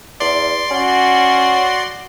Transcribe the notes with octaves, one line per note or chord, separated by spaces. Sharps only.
E2 D5 C6
C#4 F#4